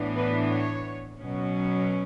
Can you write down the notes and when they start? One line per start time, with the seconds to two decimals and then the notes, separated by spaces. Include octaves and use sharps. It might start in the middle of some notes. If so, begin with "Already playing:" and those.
Already playing: A2 E3 B3 D4
0.16 B4
0.49 C#5
1.19 B2 F#3 C#4